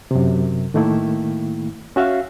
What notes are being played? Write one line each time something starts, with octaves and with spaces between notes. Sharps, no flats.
F#2 C3
A2 D#3 A3 A#3 E4
C#4 F#4 E5 F5